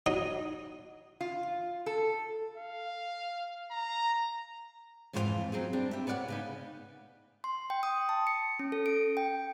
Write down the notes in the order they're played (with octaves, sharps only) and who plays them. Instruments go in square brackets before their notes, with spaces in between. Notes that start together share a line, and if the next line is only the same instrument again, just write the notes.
[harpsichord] F#3 D#4
[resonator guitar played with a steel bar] F4
A4
[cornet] F5
A#5
[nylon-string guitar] F2 G#2 E3 F4 G#4 F5
F#3 C4 D#4 G#4
G3 C4 D4
G4 E5
B3 C#5 D5 F5 F#5
C#3 B3 D#4
[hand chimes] C6
G5
D#6
A5
C#7
C#4
A4
D7
G5